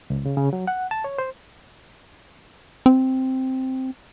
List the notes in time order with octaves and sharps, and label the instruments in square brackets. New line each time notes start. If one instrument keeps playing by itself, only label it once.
[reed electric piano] C#2
C#3
C#3
F#3
F#5
A5
C#5
C5
[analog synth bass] C4